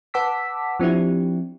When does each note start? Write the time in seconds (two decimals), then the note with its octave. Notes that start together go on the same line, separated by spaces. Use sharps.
0.14 B4 F#5 A5 D6 E6 B6
0.80 F3 C4 D4 E4 G4